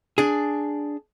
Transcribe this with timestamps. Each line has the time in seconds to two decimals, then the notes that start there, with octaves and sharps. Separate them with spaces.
0.18 D4 G#4